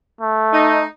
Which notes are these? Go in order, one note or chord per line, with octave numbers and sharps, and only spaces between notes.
A3
D#4